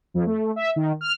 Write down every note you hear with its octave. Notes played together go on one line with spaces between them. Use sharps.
F2
A3
E5
D#3
F6